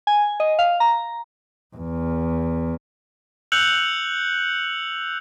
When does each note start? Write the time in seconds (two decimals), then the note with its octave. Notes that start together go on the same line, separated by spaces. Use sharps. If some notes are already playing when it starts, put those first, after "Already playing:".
0.07 G#5
0.40 D#5
0.59 F5
0.80 A#5
1.76 E2
3.52 E6 F#6 G6 C#7 F7 F#7